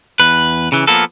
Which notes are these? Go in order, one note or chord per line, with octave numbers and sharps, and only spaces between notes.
E2 B4
C#3 E3
F3 A#3 B3 A4